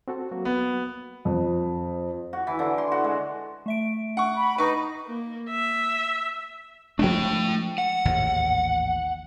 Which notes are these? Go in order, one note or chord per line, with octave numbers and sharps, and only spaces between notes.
C4 F#4 A4
F#3 A#3 F#4
B3
F2
F#4
E3
D3
C6
F#4
G#3
A3 E5 D7
F#5 C#6
B5
D#4 B4 C#6
A#3
E5
F3 G#3 A3 D4 G5
F#5
A1 D#2 G#2